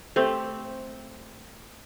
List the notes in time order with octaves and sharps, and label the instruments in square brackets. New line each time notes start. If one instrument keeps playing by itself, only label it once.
[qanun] A3 C4 G4